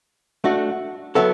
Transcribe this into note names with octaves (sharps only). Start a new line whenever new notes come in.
A3 D4 F#4
F#3 B3 E4 A4